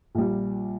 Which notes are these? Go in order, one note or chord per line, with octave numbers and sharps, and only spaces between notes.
A#1 A#2 G3